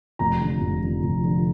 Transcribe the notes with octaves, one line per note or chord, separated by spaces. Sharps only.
F1 A#5
F2 D3 F3
F1
F2 D3 F3
F1
F2 D3 F3